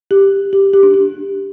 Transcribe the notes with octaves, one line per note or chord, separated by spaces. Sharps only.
G4
G4
G4
D4
G4